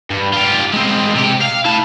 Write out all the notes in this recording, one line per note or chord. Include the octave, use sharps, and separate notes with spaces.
G2
F4 G4
G#3 C4
C3 G4
F5
E4 A5